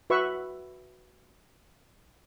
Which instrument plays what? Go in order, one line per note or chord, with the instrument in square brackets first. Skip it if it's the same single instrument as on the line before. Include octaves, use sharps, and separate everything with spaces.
[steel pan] F#4 B4 E5 C#6